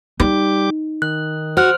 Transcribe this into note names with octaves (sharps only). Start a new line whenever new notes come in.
G3 D#4 G4 D6
D#3 F#6
F#4 C5 F6 F#6